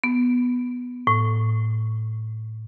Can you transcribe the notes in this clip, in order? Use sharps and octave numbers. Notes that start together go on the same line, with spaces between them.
B3
A2